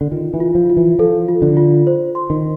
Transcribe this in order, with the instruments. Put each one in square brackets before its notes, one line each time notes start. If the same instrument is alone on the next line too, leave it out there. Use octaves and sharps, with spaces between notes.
[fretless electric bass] D3
[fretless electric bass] D#3 [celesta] F4
[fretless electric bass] E3
[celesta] F4
[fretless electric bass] F3
[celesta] F4
[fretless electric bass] E3
[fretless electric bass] F3 [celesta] A4
[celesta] F4
[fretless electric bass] D3
[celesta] F4
C5
C6
[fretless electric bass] D#3